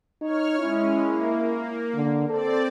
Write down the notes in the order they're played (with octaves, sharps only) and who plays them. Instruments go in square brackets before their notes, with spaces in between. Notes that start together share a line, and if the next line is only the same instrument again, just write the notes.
[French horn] D#4 [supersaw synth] C#5 F6
[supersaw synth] G#3 C#4 [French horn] E4
[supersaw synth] A#3
[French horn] D3
[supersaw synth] C4 D5 [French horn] A4